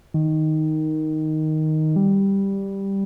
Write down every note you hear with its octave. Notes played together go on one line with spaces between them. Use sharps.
D#3
G3